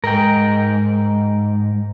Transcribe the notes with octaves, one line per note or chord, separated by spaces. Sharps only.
G#2 A#4 G5